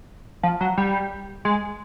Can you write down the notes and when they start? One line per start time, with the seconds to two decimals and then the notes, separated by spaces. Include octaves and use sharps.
0.43 F3
0.60 F#3
0.78 G3
1.45 G#3